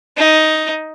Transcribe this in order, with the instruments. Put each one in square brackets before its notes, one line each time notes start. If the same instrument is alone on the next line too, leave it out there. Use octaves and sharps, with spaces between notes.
[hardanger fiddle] D#4